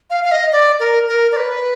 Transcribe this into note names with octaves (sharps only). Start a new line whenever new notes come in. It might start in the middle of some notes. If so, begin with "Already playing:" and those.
F5
F5
D#5
D5
A#4
A#4
D5
B4